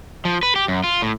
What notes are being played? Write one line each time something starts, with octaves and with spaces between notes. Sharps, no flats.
F3
B4
G4
F#2
F4
A2